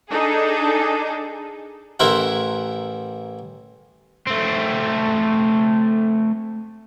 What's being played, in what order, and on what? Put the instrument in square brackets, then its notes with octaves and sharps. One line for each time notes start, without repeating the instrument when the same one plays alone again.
[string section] D4 D#4 G#4 A4
[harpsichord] A1 E4 A#4 C5 E5 F#5
[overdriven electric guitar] A3 C4